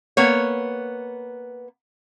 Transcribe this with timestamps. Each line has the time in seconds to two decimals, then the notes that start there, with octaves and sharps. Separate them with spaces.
0.17 A#3 B3 C#5